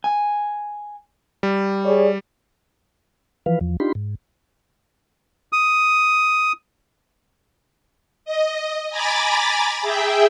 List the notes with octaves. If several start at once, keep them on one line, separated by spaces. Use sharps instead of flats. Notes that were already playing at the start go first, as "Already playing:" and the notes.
G#5
G3
G#4 C#5 D5
E3 F3 B4 F5
E2 F3
D4 D#4 F4 G4 B5 C6
G#2
D#6
D#5
G#5 A#5 B5 D6 A6
G#4 E5 G5